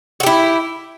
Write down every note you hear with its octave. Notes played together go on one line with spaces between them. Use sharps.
E4 F#4 G4